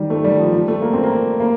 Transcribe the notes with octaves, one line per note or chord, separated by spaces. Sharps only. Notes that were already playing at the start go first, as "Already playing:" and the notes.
Already playing: D#3 G3
A3
G3
F3
G3
A3
A#3
C4
A#3
A#3